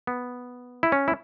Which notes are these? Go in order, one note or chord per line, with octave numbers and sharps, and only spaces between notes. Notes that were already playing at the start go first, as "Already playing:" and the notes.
B3
E4
C#4
E4